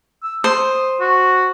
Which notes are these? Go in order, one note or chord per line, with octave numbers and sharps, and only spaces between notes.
E6
C5 D#6
F#4